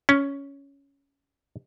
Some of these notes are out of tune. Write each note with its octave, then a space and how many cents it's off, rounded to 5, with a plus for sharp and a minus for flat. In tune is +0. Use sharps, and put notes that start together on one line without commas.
C#4 +10